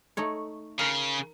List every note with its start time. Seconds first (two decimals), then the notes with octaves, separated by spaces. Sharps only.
0.17 A3 D#4 C#5
0.79 C#3 A#4